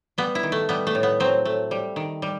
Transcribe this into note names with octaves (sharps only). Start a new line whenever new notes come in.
G3 B3
E4
D#3
A3
G3 B3
A3
A2
B3
F#3 C4
A3
G3
D#3
G3